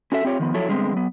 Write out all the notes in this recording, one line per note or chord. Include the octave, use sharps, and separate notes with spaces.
C#4 F#4 A4 E5
C4 F4 G4 C#5
D#3 F3 B3
F3 F#3 E4 A4 C#5
D3 G3 G#3 B3 C4
F#3 B3